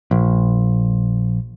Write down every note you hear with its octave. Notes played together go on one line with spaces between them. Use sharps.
A#1